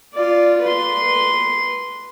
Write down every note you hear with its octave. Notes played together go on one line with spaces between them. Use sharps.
F4 D5
B4 C6